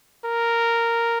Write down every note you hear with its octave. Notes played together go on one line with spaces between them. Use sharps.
A#4